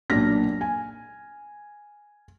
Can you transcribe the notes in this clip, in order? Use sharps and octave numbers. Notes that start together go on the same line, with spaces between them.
B1 A#2 D4 F6 A#6 B6
G#5